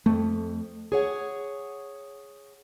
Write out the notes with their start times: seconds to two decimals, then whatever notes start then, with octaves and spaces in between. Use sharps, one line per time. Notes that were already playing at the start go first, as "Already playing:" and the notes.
0.06 F2 A3
0.92 G#4 C#5 F#5